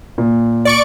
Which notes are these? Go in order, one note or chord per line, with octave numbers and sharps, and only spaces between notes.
A#2
D5 C#6 D7